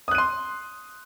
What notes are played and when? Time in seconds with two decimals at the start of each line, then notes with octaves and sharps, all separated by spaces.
0.08 D#6
0.11 F#6
0.15 D#7
0.18 C6